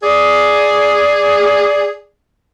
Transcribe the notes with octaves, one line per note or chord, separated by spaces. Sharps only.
G#4 D5